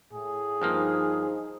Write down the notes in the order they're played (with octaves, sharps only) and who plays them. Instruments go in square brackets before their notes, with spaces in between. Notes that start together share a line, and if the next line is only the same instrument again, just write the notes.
[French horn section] A2 [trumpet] G#4
[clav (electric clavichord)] G2 F3 A#3 [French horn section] D#4 C5